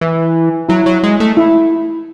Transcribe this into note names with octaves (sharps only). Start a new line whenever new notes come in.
E3
F#3 E4
F#3
G#3
A3
E4